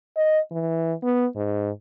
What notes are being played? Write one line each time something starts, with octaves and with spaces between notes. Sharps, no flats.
D#5
E3
B3
G#2